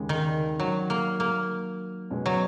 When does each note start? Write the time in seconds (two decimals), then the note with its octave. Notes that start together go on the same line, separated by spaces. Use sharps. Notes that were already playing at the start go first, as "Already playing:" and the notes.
Already playing: D#2 C#3 G#3
0.09 D#3
0.60 F#3
0.90 A#3
1.20 A#3
2.10 B2 G#3 C#4
2.26 F#3